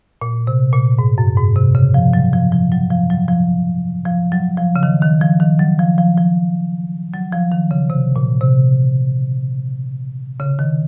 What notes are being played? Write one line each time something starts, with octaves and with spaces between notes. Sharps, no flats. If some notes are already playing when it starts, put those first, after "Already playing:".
A#2
C3
A#2
G#2
F#2
G#2
C3
C#3
F3
F#3
F3
F3
F#3
F3
F#3
F3
F3
F#3
F3
C#3
D#3
D#3
F3
D#3
F#3
F3
F3
F3
F#3
F3
D#3
C#3
C3
A#2
C3
C#3
D#3